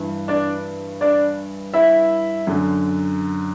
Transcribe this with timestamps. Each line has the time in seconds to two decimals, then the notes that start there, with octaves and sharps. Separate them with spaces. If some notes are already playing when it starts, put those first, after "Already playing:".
Already playing: G2 E3
0.28 D4 D5
1.01 D4 D5
1.74 E4 E5
2.47 F#2 D3